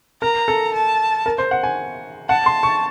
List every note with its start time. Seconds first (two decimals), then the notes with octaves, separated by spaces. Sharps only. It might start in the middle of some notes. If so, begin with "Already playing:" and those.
0.22 A#4 A#5
0.48 A4
0.74 A5
1.26 A#4
1.38 C5
1.51 F#5
1.63 G#5
2.29 F#5 A5
2.46 C6
2.63 C#6